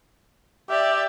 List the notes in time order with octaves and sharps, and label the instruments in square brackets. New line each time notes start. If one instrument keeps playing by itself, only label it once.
[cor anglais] G4 [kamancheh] D5 E5